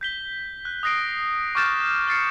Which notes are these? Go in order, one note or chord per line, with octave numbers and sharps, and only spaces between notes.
G6 B6 G7
F#6
D#6 F#6 A#6 C7 D7
C#6 D6 F6 G6 A6 E7
F6 A6 C7 C#7